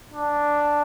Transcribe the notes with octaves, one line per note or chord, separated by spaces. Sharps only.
D4